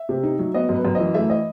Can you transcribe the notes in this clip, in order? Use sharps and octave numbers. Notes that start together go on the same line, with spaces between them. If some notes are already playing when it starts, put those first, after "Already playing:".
Already playing: E5
C3
D#4
F#3
B3 D#5
F#2
B4
F#2
E3 D#5
A3 E5
D#5